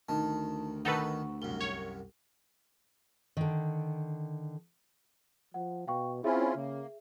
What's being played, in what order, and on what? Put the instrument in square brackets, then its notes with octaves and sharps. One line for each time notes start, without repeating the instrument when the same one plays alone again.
[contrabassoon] D2 [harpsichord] D#3 [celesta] D#4 A5
[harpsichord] D#3 [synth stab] D#4 A4 B4 [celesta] F#5 C#6
[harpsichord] C2 F#2 [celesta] G7
[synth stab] C#5
[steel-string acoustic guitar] D3 D#3
[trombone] F3 [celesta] F#5
[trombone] B2 [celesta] F5 G5 C#6
[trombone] C4 [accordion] C#4 E4 F4 [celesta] G#4 E5
[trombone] C#3 [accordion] A#3